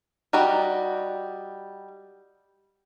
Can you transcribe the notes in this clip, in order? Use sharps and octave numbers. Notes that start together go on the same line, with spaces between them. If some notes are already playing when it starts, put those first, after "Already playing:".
G3 D#4 F#4 G4 D5